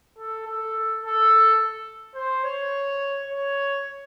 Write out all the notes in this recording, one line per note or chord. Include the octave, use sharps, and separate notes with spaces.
A4
A4
A4
C5
C#5
C#5